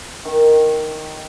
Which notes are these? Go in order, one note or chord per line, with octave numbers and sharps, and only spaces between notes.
D#3